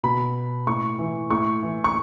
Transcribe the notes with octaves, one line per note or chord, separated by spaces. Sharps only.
B2 B5
A2 C#6
E3
A2 C#6
E3
C#6